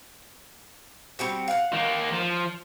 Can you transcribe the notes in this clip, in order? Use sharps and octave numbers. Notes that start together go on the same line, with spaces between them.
G3 C4 F#4
F5 F#5
D#3 A#3
F3